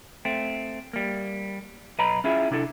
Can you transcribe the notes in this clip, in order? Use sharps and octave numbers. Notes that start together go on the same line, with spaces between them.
A3 C4
G3 A#3
B1 B4 D#5 A#5 B5
C#4 E4 F4 G#4 E5
C3 D4 E4 A4